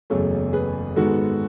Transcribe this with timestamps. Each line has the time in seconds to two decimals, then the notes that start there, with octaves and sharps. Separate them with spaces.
0.10 F#1 E2 C#3 F#3 A3 A4 C#5
0.53 G#4 B4
0.96 G#2 D#3 G#3 B3 F#4 A4